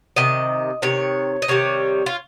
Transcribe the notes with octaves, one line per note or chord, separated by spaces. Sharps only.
C3 D#3 D#5
C3 D#3 C#5
D#5
C3 D#3 G3 C#5
F4